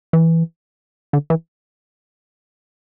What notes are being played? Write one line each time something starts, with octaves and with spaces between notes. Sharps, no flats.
E3
D3
E3